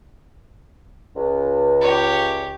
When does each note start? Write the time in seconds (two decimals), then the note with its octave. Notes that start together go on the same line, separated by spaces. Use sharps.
1.15 C#2
1.81 G4 C#5